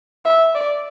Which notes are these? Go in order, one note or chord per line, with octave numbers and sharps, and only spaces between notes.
E5
D5